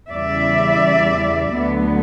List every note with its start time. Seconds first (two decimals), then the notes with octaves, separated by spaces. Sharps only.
0.10 E2 C#3 E3 G3 D5 E5
1.54 D2 D3 F#3 B3